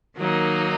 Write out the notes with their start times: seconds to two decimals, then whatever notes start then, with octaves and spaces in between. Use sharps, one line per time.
0.17 D#3 F#3 A#3 D#4